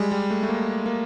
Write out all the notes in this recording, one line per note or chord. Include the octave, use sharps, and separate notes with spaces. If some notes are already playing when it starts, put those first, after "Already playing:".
Already playing: G3 G#3
G3
A3
A3
A#3
A#3